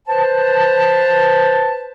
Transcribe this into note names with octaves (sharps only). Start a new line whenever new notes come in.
B4 C5 A5